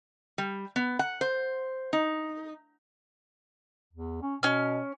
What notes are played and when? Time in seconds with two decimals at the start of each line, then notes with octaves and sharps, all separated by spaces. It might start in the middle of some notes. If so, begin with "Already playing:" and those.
0.38 G3
0.76 B3
0.99 F#5
1.21 C5
1.93 D#4
3.93 E2
4.22 C#4
4.43 B2 C#4 F6